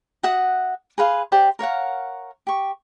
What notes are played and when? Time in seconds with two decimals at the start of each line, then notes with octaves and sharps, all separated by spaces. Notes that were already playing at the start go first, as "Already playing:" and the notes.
0.23 F#4 E5 F#5 D#6
0.98 G#4 B4 F5 C6
1.32 G4 C5 D5
1.59 A#4 C#5 F5 F#5
2.47 G4 C#6